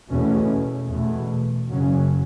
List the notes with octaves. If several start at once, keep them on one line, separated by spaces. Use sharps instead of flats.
E2 B2 A3 C#4
E2 B2 A3
F#2 C#3 F#3 C#4